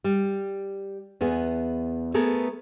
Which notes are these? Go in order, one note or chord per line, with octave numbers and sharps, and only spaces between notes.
G3
E2 B3 G#4
A3 B3 G#4 A#4